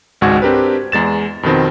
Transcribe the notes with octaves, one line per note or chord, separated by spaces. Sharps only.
G#1 C#2 G#2 F#4 C#6 G#6
C4 D4 G4 A#4 B4
E2 G#3 A6 E7
F2 B2 D#3 C4